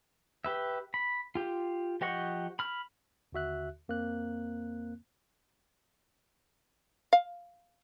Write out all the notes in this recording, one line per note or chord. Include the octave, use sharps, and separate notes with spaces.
G4 B4 E5
B5
F4 G4
F3 G4 D#5 F#5 C#6
B5 F6
D#2 D3 F#4 E5 F#6
F2 A#3 C4 F#6
F5